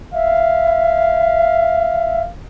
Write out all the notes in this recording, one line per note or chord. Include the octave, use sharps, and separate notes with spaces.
E5 F5